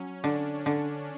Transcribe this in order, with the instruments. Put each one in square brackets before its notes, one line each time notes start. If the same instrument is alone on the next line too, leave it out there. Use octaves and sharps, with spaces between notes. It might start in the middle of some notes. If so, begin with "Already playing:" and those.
Already playing: [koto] F#3 [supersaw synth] C#4
[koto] D3 [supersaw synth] D4
[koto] D3